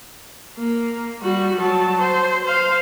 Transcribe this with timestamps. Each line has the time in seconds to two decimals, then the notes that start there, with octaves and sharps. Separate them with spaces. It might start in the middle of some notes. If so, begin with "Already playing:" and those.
0.58 A#3
1.22 G3 F#4
1.57 F#3 A5
2.01 C5
2.44 C5 F5